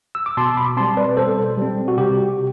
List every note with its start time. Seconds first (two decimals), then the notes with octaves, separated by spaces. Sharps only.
0.15 E6
0.26 D6
0.37 B2 A5 C6
0.57 B5 D6
0.77 C4 A5 C6
0.80 G3
0.97 B4 D5
1.17 B2 A4 C5
1.57 G3 C4
1.88 F#4
1.97 C3 G4